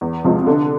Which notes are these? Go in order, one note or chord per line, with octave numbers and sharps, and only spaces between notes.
E2
C3 F3 G#3
D3